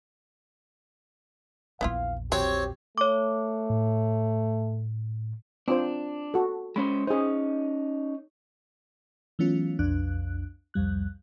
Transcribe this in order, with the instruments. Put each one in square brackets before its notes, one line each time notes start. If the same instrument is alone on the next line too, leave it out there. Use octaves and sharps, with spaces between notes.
[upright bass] A#1 E2 [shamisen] B3 E4 F4 [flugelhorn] F5
[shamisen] F#3 [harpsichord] C4 C#5 [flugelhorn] G4
[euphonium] A3 [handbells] C#5 D6
[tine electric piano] A2
[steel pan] C4 F4 C5 [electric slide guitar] D4
[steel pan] F#4 A4
[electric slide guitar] G#3 C#4 C5 [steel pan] B5
[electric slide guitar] C#4 D#4 [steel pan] G#4 C5
[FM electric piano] E3 F#3 A3 B3 C#4 F4
B1 F2 D4 F#6
C2 F2 G3 F#6